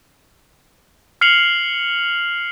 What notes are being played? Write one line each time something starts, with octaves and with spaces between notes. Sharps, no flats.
F6 C7 C#7 F7 F#7